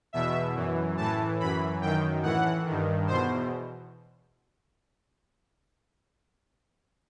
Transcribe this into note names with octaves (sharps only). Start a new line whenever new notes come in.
E2 B2 E5
F#2 E3
A2 E3 A5
F#2 E3 B5
F#2 D#3 G5
A2 E3 F#5
G2 D#3
E2 B2 C5